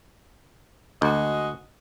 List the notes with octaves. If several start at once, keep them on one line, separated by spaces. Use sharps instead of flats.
D2 G#3 F#4 D#5